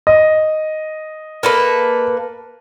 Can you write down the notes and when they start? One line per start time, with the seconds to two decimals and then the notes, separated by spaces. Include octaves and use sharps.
0.07 D#5
1.43 A#3 A4 B4